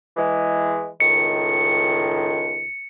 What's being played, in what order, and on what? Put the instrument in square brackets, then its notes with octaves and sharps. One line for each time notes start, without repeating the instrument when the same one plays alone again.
[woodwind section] E3 G#3
[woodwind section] C#2 A2 D#3 [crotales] C#7